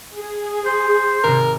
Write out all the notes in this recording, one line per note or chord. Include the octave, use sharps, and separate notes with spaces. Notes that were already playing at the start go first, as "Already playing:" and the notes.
G#4
C5 G6
G#1 C3 A#4